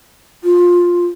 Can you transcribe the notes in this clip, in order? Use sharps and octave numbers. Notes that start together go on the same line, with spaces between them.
F4